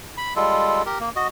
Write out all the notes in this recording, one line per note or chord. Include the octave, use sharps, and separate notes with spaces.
B5
G3 G#3 F4 A4
G4 A#4
A#3
F#4 D#5